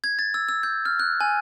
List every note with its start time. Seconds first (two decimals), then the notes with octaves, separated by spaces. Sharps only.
0.04 G#6
0.19 A6
0.34 E6
0.48 E6
0.63 G6
0.85 F6
1.00 F#6
1.21 G#5